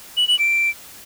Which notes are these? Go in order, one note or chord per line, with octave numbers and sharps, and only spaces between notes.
F#7
F#7
D7